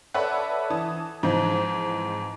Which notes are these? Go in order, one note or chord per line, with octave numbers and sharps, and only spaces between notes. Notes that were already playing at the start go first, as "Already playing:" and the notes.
A4 B4 C#5 D5 E5 F#5
E3 A5 D#6
G#2 E3 F3 C4 D#4